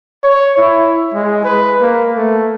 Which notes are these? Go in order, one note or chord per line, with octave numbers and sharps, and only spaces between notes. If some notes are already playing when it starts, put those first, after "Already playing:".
C#5
E4
G#3
B4
A#3
A3